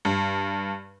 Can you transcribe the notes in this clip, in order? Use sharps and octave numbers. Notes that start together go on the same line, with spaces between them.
G2